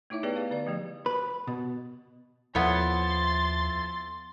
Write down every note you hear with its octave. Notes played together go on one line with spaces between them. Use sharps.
A3 D#4 E4 C#5 E5
B3 G4 G#4 B4 D5 G5
B4 F5
D3 B4 D5
F3 A3 G4
B4
B2
D#2 F3 B3 E4 A4 C#5 C6 A6